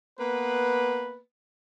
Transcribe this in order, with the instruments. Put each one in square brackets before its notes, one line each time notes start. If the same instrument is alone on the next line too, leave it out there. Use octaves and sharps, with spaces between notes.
[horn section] A#3 B3 B4